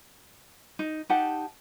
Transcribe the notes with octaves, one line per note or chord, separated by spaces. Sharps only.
D#4
D#4 G4 F#5 A5